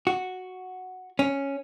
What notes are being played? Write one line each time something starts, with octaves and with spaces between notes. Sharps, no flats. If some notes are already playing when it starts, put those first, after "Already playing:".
F#4
C#4